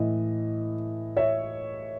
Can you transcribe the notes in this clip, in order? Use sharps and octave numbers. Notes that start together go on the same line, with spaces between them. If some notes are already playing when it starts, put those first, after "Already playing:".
Already playing: A2 E3 D#5
C#5 E5